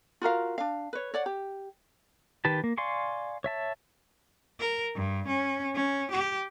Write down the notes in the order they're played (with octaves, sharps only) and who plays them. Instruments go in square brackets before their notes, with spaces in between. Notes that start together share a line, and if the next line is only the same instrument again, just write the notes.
[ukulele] F4 F#4 A#4 F5
D4 F5
B4 C#5
C#5 D5 F#5
G4
[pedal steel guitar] D#3 G4 B4 A5
A#3
D5 F5 G#5 C6 C#6
C#5 E5 A5
[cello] A#4
G2
C#4
C#4
G4